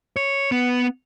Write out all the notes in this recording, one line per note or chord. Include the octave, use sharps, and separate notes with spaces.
C#5
B3